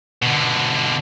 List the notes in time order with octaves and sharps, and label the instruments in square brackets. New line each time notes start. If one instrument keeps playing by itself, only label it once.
[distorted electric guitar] B2 D3